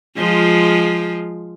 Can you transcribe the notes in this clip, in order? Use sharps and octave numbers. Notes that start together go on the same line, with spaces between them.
F3 G#3 F4